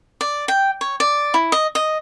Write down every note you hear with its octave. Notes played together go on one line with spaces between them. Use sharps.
D5
G5
C#5
D5
E4
D#5
D#5